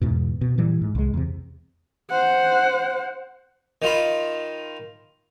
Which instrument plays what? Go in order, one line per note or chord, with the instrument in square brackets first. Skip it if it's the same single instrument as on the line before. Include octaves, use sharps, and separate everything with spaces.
[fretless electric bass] E2 G#2 B2
B2
A#2 E3 G3
G#2
C2 G#3
E2 C3
[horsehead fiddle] C5 F#5
[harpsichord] D#3 F4 B5